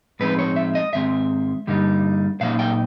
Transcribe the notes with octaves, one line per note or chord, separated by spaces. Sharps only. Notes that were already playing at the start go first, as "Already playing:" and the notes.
A2 F3 G#3 C4 D#4 B4
C#5
E5
D#5
G#2 D#3 G#3 C4 E5
G2 D3 G3 A#3 D#4
A#2 F#3 A#3 D#4 F5
G5